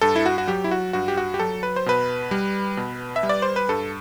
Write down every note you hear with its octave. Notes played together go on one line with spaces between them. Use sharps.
G2 A4
E4
F#4
F#4
F#3 G4
E4
F#4
G2 F#4
G4
F#4
G4
F#3 A4
B4
C5
B2 B4
G3
B2
E5
G3
D5
C5
B4
G2 A4